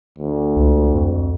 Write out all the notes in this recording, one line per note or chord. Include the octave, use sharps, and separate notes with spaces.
D2
C#2
F2